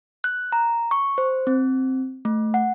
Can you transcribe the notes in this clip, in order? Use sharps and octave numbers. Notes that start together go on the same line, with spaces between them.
F#6
A#5
C#6
C5
C4
A3
F#5